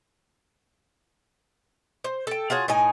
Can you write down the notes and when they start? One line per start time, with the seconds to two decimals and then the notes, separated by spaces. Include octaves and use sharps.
2.04 C5
2.27 A4 G5
2.50 F4 F#4 G#4 C#5
2.68 A2 D#4 G#5